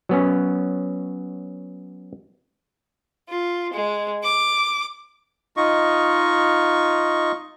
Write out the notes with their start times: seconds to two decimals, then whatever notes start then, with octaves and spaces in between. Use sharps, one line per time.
0.09 F#3 B3 C#4
3.29 F4
3.73 G#3
4.23 D6
5.57 D#4 F4 D#5 C#6